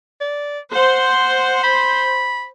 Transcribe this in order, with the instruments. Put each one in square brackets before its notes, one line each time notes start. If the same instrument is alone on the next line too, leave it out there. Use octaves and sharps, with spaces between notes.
[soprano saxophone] D5
[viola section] C5 [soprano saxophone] F#5
[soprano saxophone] B5